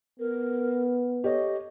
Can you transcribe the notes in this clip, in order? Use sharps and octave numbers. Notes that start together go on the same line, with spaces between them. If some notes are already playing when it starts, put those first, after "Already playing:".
B3 A#4
G4 A4 C#5 D#5